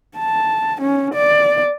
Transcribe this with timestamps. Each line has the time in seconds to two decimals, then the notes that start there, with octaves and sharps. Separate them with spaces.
0.18 A5
0.81 C#4
1.14 D5